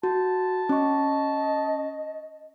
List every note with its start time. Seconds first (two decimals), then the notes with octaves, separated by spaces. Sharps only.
0.03 F#4 A5
0.69 C#4 D#5 C#6